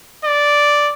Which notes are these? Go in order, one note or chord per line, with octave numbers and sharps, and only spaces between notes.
D5